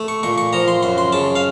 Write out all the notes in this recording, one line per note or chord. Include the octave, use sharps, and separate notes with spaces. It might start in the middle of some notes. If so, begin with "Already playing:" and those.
Already playing: A3
C#6
A#2 C#6
C#6
F3 A#5
C6
F#2 C6
C6
C#3 A5
F5